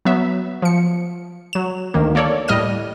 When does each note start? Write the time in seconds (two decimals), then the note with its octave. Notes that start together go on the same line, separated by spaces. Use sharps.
0.05 F#3 B3 E5
0.62 F3 C#7
1.53 F#3 E7
1.94 D2 D#3 A#3
2.15 A#3 A4 C#5 D5
2.48 A2 G3 D#5 F6 D#7